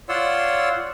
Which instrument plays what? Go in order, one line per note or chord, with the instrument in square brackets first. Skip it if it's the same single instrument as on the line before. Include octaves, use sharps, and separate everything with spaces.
[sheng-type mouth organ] F4 C#5 D5 F#5 C6 E6